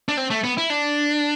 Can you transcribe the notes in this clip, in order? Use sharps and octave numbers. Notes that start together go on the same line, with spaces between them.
D4
C4
A3
B3
E4
D4